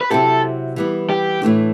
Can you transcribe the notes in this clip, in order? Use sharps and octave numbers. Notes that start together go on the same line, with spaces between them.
B4
C3 F#3 C4 E4 G4 A4
E3 G3 B3
G4
A2 E3 A3 D4